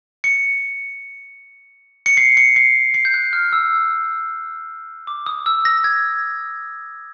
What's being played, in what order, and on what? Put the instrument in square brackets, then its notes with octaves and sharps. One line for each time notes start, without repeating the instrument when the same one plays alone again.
[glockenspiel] C#7
C#7
C7
C#7
C7
C7
G6
F#6
F6
E6
D6
D#6
E6
A#6
G#6